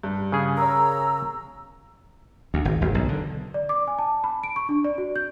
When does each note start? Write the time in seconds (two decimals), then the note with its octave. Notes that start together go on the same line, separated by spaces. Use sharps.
0.03 G2
0.32 C#3 G#4
0.57 A#4 C#5 A#5 E6
2.54 D2
2.65 G#1
2.81 G#1
2.94 B1
3.08 D3
3.54 D5
3.69 D6
3.87 G#5
3.99 A5
4.24 B5
4.43 D7
4.56 C#6
4.69 D4
4.84 D5
4.98 F#4
5.16 G6